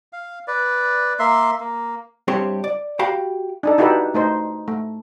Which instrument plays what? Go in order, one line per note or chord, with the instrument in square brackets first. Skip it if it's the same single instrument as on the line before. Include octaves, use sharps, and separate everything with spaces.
[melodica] F5
B4 D5
A#3 E5 C6
A#3
[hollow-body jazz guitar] G2 C4 E4 G4 C#5 C6
D5
F#4 G4 F5 G5 B5
[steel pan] D4 D#4 A4
D#4 E4 F#4 G4 A4 B4
A3 D#4 C5
A3